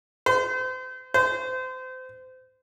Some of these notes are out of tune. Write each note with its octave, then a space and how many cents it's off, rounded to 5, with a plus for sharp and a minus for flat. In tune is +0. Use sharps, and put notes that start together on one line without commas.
C5 -35
C5 -30